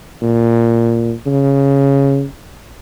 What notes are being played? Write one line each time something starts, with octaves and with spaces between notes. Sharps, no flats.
A#2
C#3